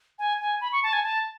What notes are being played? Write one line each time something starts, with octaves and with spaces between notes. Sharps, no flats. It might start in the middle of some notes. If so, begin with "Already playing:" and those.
G#5
G#5
B5
C#6
A5
G#5
A5